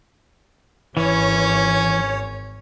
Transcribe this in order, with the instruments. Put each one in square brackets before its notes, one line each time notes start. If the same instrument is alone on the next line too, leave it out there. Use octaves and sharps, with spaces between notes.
[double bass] G#1 [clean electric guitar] E3 [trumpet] C#4 [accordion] C#5